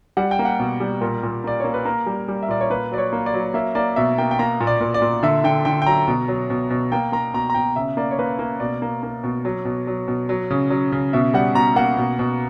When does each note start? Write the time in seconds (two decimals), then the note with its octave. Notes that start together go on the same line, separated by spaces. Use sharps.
0.17 G3 F#5
0.31 G5
0.39 A#3
0.45 F#5
0.59 B2
0.80 G3
1.01 A#2 A#4
1.23 A#2
1.44 A#3 D5
1.60 A#3 C#5
1.74 B4
1.85 A#3 A#4
2.06 G3
2.28 G3
2.43 E5
2.49 A#2 D5
2.61 C#5
2.70 A#3 B4
2.92 F#3 D5
2.98 C#5
3.12 A#3
3.26 D5
3.34 F#3
3.54 A#3 E5
3.75 A#3 D5
3.96 B2 E5
4.18 A#3 G5
4.31 G5
4.39 A#3 A#5
4.60 A#2
4.67 D5
4.81 A#2
4.94 D5
5.02 A#2
5.23 D3 E5
5.44 D3 G5
5.65 D3 G5
5.82 G5
5.86 F#3 A#5
6.08 B2
6.28 F#3
6.50 B2
6.70 B2
6.92 A#3 G5
7.12 A#3 A#5
7.34 B2 A#5
7.50 A#5
7.54 B2 G5
7.76 C#3 E5
7.97 A#3 D5
8.11 C#5
8.19 A#3 B4
8.39 A#3
8.60 B2 D5
8.82 A#3
9.03 A#3
9.24 B2
9.45 F#3
9.65 B2
9.87 F#3
10.08 B2
10.29 F#3
10.51 C#3
10.70 F#3
10.92 C#3
11.13 B2 E5
11.34 G3 F#5
11.55 B2 A#5
11.76 A#3 F#5
11.97 B2
12.19 B2